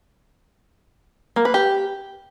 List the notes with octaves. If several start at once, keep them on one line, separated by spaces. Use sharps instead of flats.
A#3
B4
G4